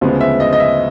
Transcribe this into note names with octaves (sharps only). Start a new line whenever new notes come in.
D2 C#3 F3 G#3 B3
E5
D#5
D#5
E5